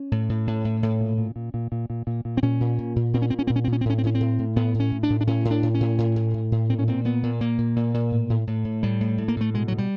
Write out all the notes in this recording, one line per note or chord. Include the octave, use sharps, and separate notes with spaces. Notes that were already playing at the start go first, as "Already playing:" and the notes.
Already playing: C#4
A2
A2
A2
A2
A2
A#2
A#2
A#2
A#2
A#2
A#2
A#2
A#2
C4
A#2 C#4
A#2
A#2
A#2
A#2 C4
C#4
A#2 C4
C#4
A#2 C4
C#4
A#2 C4
C#4
C4
A2 C#4
C4
A2 C#4
C4
A2
A2
A2 B3
A2
C#4
A2
D4
A2
D4
A2 C#4
A2
D4
A2
C#4
A2
A2
A2
A2
A2
A#2 C4
C#4
A#2 C4
A#2 B3
A#2
A#2 A#3
A#2
A#2
A#2
A2
A2
A2
A2
A2 G3
A2
A2
A#3
A2 A3
B2 G#3
B2 F#3
G3